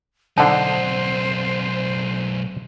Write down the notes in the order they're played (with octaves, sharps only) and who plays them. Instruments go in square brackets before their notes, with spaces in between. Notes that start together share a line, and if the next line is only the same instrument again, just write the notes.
[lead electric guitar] B1 C4 [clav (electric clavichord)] D3 D#4 [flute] C5 [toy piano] F#5 A5